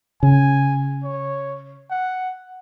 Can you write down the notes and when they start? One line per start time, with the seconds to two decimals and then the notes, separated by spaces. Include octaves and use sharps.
0.23 C#3 G#5
1.04 C#5
1.91 F#5